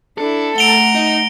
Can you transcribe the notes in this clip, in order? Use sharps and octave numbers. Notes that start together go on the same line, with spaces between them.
D4 E4 A4
A3 F#5 A#5 D7 F7 G7
D#4